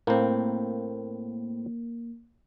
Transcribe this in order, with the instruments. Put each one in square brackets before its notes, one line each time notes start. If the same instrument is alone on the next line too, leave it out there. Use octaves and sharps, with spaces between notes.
[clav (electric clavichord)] A2 C4 [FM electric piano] A#3